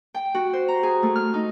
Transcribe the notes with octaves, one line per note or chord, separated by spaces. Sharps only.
G5
F#4
C5
A#5
G#4
A3
F6
D#4